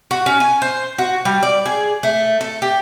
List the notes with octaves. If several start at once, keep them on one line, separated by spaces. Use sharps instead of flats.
F#4
C#4
G#5
C5
F#4
G3
D5
G#4
A3
A4
G4